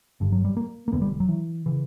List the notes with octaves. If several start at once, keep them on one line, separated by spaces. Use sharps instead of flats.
G1 G2 D3
F#3
G3
A#3
A#3
E1 E2 D3 B3
G3
F#3
E3
C#3 E3